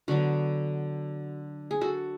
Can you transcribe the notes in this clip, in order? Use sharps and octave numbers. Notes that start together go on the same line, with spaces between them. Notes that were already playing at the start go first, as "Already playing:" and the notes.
D3 F#3 B3 D4 F#4
G#4
F#4 A4